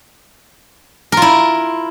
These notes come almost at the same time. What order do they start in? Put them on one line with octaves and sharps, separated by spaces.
A#4 F4 E4